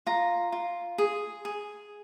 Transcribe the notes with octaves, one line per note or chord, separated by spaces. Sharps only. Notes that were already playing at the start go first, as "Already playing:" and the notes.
F4 A#5
F4
G#4
G#4